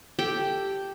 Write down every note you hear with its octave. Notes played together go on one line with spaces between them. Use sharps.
G4 A4 G5